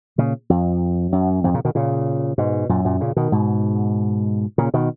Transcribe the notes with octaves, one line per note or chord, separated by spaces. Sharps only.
A#2 C#3
F2
F#2
F2 G#2
A#2 C#3
B2 D#3
A#2 C#3
G#2 B2
F#2 A#2
F#2 A#2
A#2 C#3
B2 D#3
G#2 B2
A#2 C#3
B2 D#3